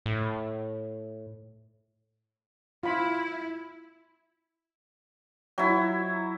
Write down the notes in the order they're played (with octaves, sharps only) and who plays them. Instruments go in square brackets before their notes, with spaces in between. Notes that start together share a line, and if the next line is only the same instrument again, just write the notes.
[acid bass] A2
[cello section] E4 [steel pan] F4 B5
[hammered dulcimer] F#3 E4